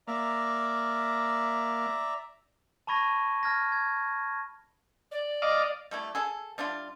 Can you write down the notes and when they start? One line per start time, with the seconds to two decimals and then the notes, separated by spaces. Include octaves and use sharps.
0.08 A#3 D5 E5 F5 A#5
2.87 A5 B5 C#6 G#6 A#6 D#7
3.43 A5 F6 G#6 A#6
3.72 G#6
5.11 D5
5.42 D#5 F5 D6
5.91 G3 A3 E4
6.15 G#4 A4
6.58 G3 D4 E4 F4